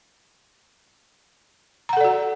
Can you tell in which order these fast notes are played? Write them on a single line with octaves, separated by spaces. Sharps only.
A#5 F#5 A4 D5 F#4